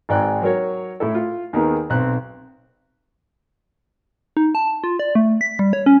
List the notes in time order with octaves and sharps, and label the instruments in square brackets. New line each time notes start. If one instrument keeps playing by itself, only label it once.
[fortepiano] G#1 G#2 D5 G5 F#6
F#3 A#4 C#5
A2 E4 A4
F4
D#2 D#3 B3 G#4
B1 C4 F#6
[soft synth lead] D#4
A5
F4
D5
A3
B6
G3
C#5
C#4